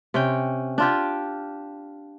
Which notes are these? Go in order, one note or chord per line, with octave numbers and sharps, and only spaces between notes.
C3 C#4 G5
D4 F4 G4